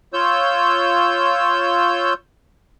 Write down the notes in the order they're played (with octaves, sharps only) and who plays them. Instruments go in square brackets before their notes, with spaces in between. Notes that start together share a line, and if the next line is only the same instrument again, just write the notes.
[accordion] F4 C#5 E6 G6